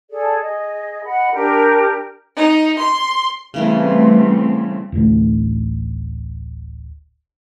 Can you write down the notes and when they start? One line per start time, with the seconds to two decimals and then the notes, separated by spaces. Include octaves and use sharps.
0.10 G#4 A4 D5
0.41 G#4 D#5
1.05 D#5 F#5 B5
1.33 D4 G4 A#4
2.36 D#4
2.78 C6
3.54 C#3 E3 G3 A3 B3 C4
4.92 D1 A1 A2 A3